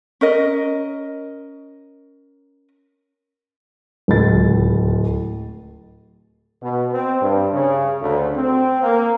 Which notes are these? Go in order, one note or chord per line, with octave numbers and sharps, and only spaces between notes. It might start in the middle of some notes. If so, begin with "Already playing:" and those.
C#4 A#4 D#5
D1 C#2 A6
B2
C4
G2
C#3
D2
C4
A#3